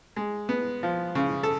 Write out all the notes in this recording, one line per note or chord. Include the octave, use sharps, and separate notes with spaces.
G#3
B3
F3
C#3
A4